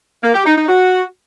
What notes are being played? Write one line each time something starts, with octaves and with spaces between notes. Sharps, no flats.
A#3
G4
D#4
D#4
F#4